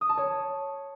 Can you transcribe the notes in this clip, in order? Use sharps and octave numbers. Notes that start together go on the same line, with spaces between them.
D#6
A5
C#5